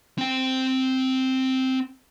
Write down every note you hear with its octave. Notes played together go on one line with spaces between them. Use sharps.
C4 G5